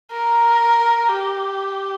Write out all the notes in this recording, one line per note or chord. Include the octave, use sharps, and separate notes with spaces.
A#4
G4